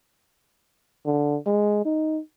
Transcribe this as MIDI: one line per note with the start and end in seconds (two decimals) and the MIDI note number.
1.06 1.37 50
1.46 1.82 56
1.85 2.19 63